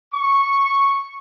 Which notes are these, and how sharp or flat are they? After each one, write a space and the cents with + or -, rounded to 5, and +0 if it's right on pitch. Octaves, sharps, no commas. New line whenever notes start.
C#6 -5